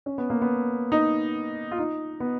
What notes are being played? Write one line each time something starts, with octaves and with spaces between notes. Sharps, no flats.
C#4
B3
A#3
B3
D#4
F4
D#4
B3